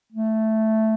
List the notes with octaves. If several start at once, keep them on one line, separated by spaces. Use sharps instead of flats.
A3